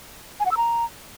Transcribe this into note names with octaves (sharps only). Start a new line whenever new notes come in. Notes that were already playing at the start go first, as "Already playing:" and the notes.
G#5
F#5
E6
A#5